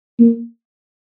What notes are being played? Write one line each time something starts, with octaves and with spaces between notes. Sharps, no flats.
A#3